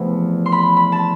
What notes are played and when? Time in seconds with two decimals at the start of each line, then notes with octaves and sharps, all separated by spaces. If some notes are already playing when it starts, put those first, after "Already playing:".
Already playing: E2 C3 F3 A3
0.46 C6
0.52 B5
0.77 B5
0.92 A5